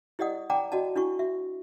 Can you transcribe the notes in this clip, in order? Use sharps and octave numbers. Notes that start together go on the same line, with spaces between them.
E4 G4 D5 D#5 F#5 D#6
D5 F#5 G5 A5 A#5 D6
F#4 D5 D#5 F#5 A5
D4 E4 F#4 C#6
F#4 E5